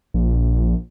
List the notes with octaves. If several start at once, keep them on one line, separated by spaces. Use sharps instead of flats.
A#1